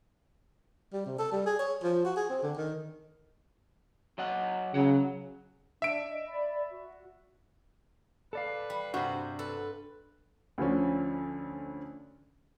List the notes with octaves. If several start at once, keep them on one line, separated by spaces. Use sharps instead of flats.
G3
C3
A4
G3
G#4
C#5
F3
F#4
G#4
C4
D3
D#3
F#3 D#5 F#5
C#3 F#3 F#5
D4 E5 D7
D#5
D5 B5
F#4
A4 B4 D5 F5
G3
G2 C3 F#4 C5
A4 B4
D2 D3 F3 C#4